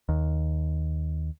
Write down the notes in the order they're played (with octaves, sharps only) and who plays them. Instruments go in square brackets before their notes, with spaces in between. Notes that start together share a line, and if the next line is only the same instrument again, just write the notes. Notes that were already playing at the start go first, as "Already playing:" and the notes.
[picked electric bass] D#2